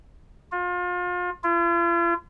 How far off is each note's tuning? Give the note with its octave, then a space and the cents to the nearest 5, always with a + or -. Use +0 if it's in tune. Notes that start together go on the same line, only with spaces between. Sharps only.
F4 +35
F4 -45